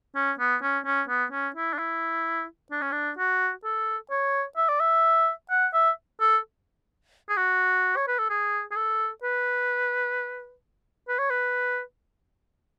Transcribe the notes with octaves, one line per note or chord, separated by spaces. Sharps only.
C#4
B3
C#4
C#4
B3
C#4
E4
D4
E4
D4
C#4
D4
F#4
A4
C#5
E5
D5
E5
F#5
E5
A4
G#4
F#4
C#5
B4
A4
G#4
G#4
A4
B4
B4
C#5
B4